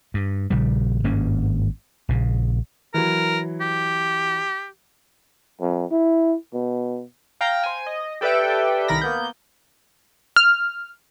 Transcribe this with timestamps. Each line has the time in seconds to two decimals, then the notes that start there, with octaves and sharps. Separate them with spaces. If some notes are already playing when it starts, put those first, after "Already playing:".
0.14 G2
0.50 A#1 C#3 G3
1.04 G#1 G2 A#3 C#4
2.09 A#1 C#3
2.94 E3 F#3 A#4
3.61 G4
5.61 F2
5.91 E4
6.54 B2
7.41 F5 G5 A#5
7.64 C5 G#5
7.87 D#5
8.21 G4 A4 B4 D5 E5 G5
8.88 C2 D#3 A#4 B5 A#6
9.01 A#3 B3 G6
10.36 F6